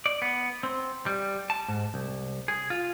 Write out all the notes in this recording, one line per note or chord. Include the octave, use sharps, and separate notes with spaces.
D5
B3
C4
G3
A5
G#2
C2
G#4
F4